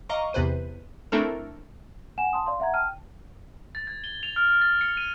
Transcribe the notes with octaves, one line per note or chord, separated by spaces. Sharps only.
D#5 F5 A#5 C#6 D6
E2 C3 B4 C5 D#7
A3 C4 D4 E4 A4 A#4
F#5 G#5 E7
A5 C6 D#6
D5 F5 C6
E5 F#5 A#5 G#6
G5 A5 F6 D#7
A6
G#6
G7
F7
F6
F6
A6
C#7
D#7